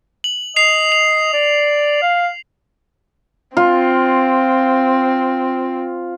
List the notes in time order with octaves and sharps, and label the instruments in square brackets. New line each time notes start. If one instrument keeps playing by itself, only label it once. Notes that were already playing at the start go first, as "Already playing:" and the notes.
[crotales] F#7
[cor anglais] D#5 [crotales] C7 F7
[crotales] F7
[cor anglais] D5
F5
[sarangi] C4 [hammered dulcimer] F4